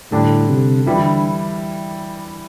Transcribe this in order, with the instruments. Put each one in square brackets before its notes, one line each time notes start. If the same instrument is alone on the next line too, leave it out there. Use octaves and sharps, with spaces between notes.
[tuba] A2 [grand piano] D3 G3 D4
[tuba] C3
[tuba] D3 [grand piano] E3 G3 E4